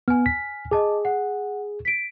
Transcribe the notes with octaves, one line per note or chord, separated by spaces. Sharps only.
B3 G#5 F6
B6
G#4 D#5 A5 D6
F#5
B6 D7